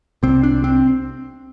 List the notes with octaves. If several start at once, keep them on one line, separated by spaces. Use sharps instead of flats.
C2 C3 C4
D4
C4